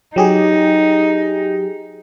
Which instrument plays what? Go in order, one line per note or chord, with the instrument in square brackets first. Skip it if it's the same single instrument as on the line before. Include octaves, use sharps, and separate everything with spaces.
[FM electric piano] F#3 G4 G#4 [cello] D#4